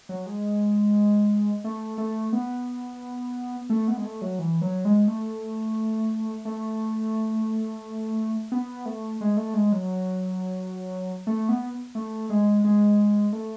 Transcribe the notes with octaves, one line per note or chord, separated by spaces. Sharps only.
F#3
G#3
A3
A3
B3
A3
B3
G#3
A3
F#3
E3
F#3
G#3
A3
A3
B3
A3
G#3
A3
G#3
F#3
A3
B3
A3
G#3
G#3
A3